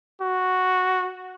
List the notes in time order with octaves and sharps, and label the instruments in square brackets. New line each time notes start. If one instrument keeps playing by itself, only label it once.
[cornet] F#4